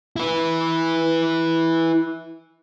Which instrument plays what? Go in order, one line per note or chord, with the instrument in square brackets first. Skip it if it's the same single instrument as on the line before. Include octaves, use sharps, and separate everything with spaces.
[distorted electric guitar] E4 B4